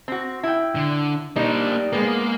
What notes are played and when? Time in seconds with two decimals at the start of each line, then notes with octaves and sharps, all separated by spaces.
0.08 C4 F#4
0.43 E4 G5
0.76 D3
1.36 G3 A#3 D4 D#4
1.93 G#3 A#3 B3